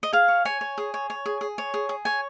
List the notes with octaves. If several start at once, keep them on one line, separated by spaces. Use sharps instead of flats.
D#5
G#4 F5
C#5
C#5 G#5
C#5
G#4
C#5
C#5
G#4
G#4
C#5
G#4
G#4
C#5 G#5